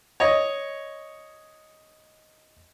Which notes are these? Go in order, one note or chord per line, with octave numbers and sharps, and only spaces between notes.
C#5 D#5